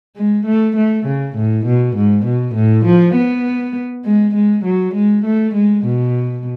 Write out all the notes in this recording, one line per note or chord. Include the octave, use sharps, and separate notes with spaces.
G#3
A3
A3
C#3
A2
B2
G#2
B2
A2
F3
B3
G#3
G#3
F#3
G#3
A3
G#3
B2